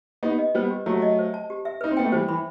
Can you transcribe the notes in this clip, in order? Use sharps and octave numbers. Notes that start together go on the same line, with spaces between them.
B3 D#4 G4
D#5
G3 B3 C5
G4
F#3 A3 G4
D#5
C5
A5
G4
E5
D#4 B4
C4
B3 G5
A3
E3 G3 C5
E3 B5